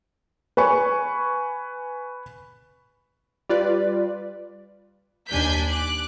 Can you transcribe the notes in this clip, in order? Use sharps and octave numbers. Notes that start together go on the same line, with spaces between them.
B4 G#5 C#6
G3 F4 B4 D5
D#2 D4 G#5 G6 B6
D6 F#6